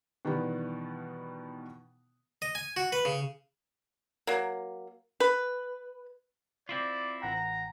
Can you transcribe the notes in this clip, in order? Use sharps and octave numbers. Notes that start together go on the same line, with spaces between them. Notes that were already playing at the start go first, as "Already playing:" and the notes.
B2 D#3 E3 G3 B3
D#5
G#5
F#4
B4
C#3
F#3 A#3
B4
C4 E4 F4 D5
A1 F#5 G5 A#5